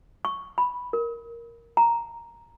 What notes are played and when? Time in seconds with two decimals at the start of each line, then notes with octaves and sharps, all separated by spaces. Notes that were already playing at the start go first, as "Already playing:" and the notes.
0.25 C#6
0.58 B5
0.93 A#4
1.77 A#5